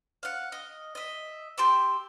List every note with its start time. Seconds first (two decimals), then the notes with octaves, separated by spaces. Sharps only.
0.23 F5 F#5
0.52 D#5
0.95 D#5 E5
1.58 G4 C6 D6 E6